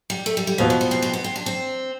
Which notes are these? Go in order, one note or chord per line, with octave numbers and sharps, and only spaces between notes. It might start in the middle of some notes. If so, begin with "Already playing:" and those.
G3
A3
G3
G3
B2 E3 B3 F4 C5
F3
G3
C4
C4
B3
C4
D4
C4